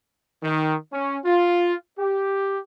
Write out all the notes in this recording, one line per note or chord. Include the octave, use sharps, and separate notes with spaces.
D#3
C#4
F4
G4